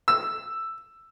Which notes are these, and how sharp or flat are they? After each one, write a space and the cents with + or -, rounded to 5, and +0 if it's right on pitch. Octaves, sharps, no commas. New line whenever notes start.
E6 +5